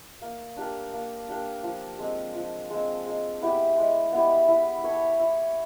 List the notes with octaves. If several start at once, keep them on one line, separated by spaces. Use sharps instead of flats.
A#3
D4 G4 A#4
A#3
D4 G4 A#4
F3
G#3 C4
F3
G#3 C4
G#3
B3 E4 G4
G#3
B3 E4 G4
E4
A4 C#5 E5
E4